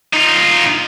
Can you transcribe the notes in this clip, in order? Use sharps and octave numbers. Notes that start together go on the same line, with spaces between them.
D#4 F4